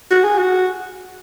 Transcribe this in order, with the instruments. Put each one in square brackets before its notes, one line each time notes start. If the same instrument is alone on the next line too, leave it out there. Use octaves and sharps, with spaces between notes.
[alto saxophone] F#4
G#4
F#4